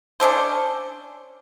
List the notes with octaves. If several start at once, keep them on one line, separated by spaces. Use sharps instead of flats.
C#4 D4 A4 C5